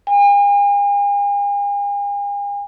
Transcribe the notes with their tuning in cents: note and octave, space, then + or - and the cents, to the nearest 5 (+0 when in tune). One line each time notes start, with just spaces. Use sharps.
G#5 -45